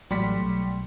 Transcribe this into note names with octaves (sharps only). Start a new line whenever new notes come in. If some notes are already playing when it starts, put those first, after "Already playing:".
A1 F#3 G3 A3 D5 F#5 C6 B6
B1